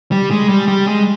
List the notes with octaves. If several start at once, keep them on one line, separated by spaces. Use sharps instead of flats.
G3
G#3
G3
G3
G#3